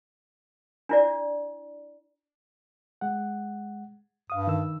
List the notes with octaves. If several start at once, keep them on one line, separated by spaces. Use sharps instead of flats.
D4 E4 D5
G#3 F#5
G2 F5 D#6
D#3 E6